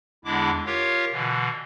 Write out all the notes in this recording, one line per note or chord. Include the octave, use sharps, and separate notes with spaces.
E2 D3 G#3 D4 E4 D6
F4 G4 A#4 C#5 F5
B2 D3 E3